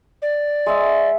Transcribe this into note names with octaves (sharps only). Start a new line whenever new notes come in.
D5
G#3 E5